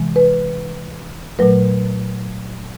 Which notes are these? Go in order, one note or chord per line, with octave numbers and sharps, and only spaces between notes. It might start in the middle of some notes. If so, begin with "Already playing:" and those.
Already playing: C3 E3 G#3
B4
A#2 F#3 A3 B4